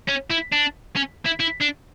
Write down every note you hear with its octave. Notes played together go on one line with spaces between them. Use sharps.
C#4
E4
D4
C#4
E4
E4
D4